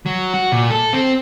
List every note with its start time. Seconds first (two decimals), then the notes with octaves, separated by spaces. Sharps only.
0.06 F#3
0.33 F#4
0.52 A#2
0.70 A4
0.93 C4